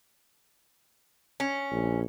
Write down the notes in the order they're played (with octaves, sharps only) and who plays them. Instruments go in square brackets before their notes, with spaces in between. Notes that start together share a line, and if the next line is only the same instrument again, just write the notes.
[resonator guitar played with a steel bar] C#4
[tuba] A#1